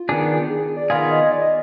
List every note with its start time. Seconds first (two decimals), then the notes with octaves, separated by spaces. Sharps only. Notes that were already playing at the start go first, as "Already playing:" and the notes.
Already playing: F4
0.09 D#3 B3 D4 G#4
0.50 G#4
0.76 D5
0.90 D#3 B3 F4 G#4 F5
1.11 D#5
1.31 D5
1.42 D#5